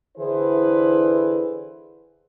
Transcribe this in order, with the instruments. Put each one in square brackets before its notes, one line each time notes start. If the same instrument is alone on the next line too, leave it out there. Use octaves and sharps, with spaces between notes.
[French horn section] D3 E3 E4 G#4 B4 C5